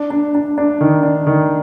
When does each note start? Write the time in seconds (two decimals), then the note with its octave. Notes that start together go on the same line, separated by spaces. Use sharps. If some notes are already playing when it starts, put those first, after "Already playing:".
Already playing: D4
0.10 D4
0.35 D4
0.58 D4
0.81 D#3
1.03 D4
1.27 D#3